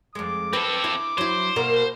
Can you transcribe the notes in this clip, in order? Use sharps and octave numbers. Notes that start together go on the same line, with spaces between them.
F2 G#3 D6
C4 A4 B4
E4
F#3 E4 C5
B2 A#3 A#4